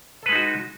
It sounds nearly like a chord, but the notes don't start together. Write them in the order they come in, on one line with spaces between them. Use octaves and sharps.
A4 B4 G#3 D#4 F#4